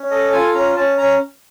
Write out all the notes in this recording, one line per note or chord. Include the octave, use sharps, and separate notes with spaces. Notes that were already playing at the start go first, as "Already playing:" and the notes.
Already playing: C#4
A4 D#5
F4 G#5
C#4 A#5
C#4 A5
C#4 A#5